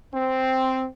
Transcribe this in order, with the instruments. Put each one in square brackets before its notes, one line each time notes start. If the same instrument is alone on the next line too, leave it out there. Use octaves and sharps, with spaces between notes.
[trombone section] C4